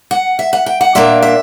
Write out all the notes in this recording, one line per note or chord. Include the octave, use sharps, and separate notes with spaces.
F#5
E5
F#5
G5
F#5
A#2 A#3 D4 E5
E5